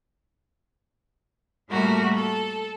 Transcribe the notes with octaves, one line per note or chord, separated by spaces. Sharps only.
A2 G3 A3 A#3 F#4 A#4
A4